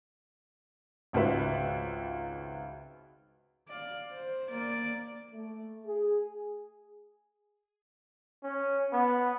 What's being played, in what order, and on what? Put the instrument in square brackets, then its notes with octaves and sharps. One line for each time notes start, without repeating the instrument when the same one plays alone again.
[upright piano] G#1 C#2 F#4 B4 E5
[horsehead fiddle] D5 F5
C5
A#3 D5
[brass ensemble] A3
G#4
[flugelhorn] C#4
B3